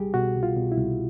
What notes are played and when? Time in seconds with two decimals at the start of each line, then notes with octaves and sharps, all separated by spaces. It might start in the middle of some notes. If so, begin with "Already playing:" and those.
Already playing: C2 G3 G4 G#4
0.14 B2 F#4
0.36 C2
0.43 F4
0.57 B2
0.72 E4
0.78 C2